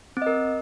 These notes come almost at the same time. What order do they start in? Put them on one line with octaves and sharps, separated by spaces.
C4 D#5 A#4